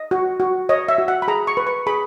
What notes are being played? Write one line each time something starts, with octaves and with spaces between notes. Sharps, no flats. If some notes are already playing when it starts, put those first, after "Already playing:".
Already playing: D#5
F#4
F#4
C#5 D#5
E5
F#4
F#5
B5
G#4 A#5
C#6
B4
C#6
G#4 B5